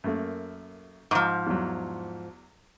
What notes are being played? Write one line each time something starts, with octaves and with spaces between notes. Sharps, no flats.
F#2 A3 A#3
G#2 F3 C#6 D6
E2 F#3